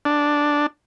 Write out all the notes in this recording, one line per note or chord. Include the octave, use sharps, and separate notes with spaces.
D4